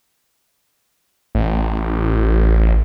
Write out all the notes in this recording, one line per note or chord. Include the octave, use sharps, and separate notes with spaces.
A1